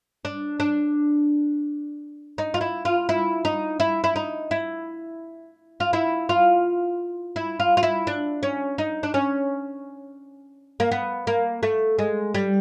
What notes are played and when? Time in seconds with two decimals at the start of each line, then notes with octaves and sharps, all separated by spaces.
0.25 D4
0.60 D4
2.38 D#4
2.54 F4
2.61 E4
2.85 F4
3.09 E4
3.45 D#4
3.80 E4
4.04 E4
4.16 D#4
4.51 E4
5.80 F4
5.93 E4
6.29 F4
7.36 E4
7.60 F4
7.77 F4
7.83 E4
8.07 D4
8.43 C#4
8.78 D#4
9.03 D4
9.14 C#4
10.80 A#3
10.91 B3
11.27 A#3
11.63 A3
11.99 G#3
12.34 G3